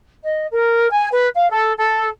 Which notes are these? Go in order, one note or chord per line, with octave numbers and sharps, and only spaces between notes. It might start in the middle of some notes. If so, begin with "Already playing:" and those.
D#5
A#4
G#5
B4
F5
A4
A4